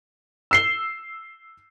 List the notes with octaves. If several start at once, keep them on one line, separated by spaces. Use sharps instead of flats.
E6 C7 G7